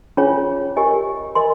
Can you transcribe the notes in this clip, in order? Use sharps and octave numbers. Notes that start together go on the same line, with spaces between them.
C#4 F4 G#4 C#5 G#5
G4 A#4 D#5 G#5 C#6
A#4 D#5 G#5 C6